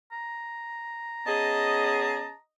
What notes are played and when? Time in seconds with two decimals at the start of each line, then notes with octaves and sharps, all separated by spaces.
0.12 A#5
1.27 B3 C#4 G#4 D#5 A5